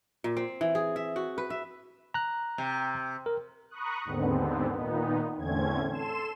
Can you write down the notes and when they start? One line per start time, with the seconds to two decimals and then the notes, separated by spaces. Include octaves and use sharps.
0.24 A#2
0.37 C4
0.61 E3
0.75 G#4
0.96 E5
1.16 F#4
1.38 B4
1.50 E5
2.14 A#5 F#6
2.58 C3
3.26 A#4
3.69 A#5 B5 C#6 D#6 F#6
4.05 D#2 G#2 D3 B3 C4
4.71 A#2 D#3 B3 D#4
5.37 E2 A2 D3 C4 C#4 G#6
5.90 A4 C6 E7